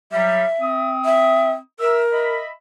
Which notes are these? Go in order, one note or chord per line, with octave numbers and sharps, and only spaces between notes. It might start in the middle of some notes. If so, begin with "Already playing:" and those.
F#3 G3 E5
C4 D#6
E5
A#4 E5 E6
D#5 E5 B5